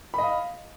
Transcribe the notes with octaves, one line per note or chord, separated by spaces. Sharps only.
D#5 F5 B5